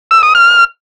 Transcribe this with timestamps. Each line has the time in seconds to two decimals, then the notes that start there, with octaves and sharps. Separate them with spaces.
0.11 E6
0.23 D#6
0.35 F6